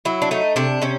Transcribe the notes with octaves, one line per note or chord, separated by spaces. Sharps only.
F#3 E4
D4
A3 D#4
C3 D4
C3 C#4